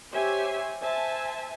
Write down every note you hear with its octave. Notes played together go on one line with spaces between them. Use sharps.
G4 C5 C#5 E5 G#5
C5 E5 G#5 A5